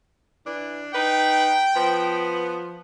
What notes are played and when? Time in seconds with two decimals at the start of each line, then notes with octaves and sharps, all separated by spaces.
0.46 E3 D4
0.94 D#4 B4 G5
1.76 F3 B3